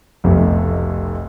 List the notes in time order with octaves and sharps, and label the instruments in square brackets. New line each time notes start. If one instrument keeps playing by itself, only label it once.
[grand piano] F1 B1 F2 C3 F3 A3